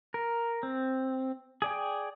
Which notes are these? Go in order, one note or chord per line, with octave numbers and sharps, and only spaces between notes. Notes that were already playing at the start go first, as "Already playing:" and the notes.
A#4
C4
G#4 D5 G5